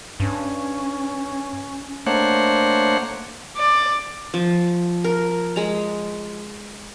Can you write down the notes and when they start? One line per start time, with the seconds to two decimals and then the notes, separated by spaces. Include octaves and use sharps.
0.20 G2 C#4
2.06 A3 A#3 D4 C5 C#5 F#5
3.57 D5
4.34 F3
5.04 A#4
5.56 G#3 A#5